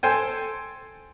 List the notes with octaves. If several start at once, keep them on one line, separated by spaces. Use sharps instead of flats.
A4 C5 G5 G#5